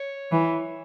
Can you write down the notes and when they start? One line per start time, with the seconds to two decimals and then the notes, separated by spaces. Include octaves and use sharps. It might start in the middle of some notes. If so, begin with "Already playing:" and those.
Already playing: C#5
0.32 E3